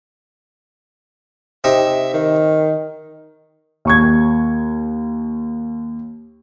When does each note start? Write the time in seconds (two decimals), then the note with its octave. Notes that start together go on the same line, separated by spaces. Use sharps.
1.64 C3 D#4 E5
2.14 D#3
3.85 D#2 C#6 G#6